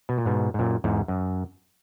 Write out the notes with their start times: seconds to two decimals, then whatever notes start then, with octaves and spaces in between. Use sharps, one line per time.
0.09 B2
0.18 A#2
0.26 G#2 B2
0.54 G#2
0.59 F#2 A#2
0.84 E2 G#2
1.08 F#2